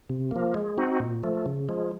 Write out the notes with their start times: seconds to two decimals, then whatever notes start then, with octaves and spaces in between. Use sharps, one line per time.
0.09 C3
0.31 F3 A#3
0.54 G#3
0.78 C4 D#4 F#4
1.00 A#2
1.23 F3 A3
1.46 C#3
1.69 F3 G#3